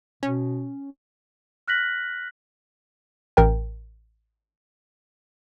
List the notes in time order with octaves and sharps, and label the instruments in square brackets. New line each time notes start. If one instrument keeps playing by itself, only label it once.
[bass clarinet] B2 [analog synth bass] C#4
[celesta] F6 F#6 A#6 B6 F#7
[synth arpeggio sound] A1 A#4 G5